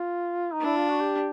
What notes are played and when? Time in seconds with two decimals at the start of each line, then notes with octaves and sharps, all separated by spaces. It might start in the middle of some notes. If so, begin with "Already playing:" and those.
Already playing: F4
0.53 D#4
0.61 D4 E4
0.77 F4
0.89 F#4
1.01 G4